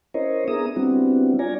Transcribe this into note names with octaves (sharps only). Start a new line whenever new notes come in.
C#4 E4 A#4 C5 C#5 D#5
B3 D4 G#4 E5 A#5 D#6
G3 B3 C4 D4 E4 F#4
D4 F4 C#5 D5 G#5 A#5